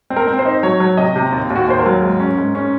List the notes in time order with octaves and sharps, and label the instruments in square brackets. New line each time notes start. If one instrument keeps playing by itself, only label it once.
[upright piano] C4
A#4
C4
C5
D#4
F#3 C#5
F#3
C3 D#5
C3
D#2
D#2
F#4
D#2 C5
A#4
F#3
G#2
C#4
G#2
C#4